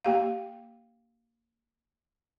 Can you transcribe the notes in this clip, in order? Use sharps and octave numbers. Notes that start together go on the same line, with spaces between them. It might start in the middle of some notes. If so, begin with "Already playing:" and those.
A#3 G4 F5